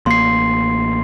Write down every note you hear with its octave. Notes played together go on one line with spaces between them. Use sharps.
A1 A#3 C6 C7